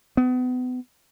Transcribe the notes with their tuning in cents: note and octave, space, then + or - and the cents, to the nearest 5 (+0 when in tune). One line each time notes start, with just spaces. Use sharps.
B3 +35